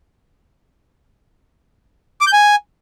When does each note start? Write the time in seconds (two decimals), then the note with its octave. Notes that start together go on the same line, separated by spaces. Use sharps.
2.21 D6
2.27 G6
2.33 G#5